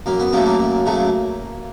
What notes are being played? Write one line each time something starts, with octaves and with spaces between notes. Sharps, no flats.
F#2 A#3
B3
C#3 F#3 A3 A#3
A#3
F#2
C#3 F#3 A3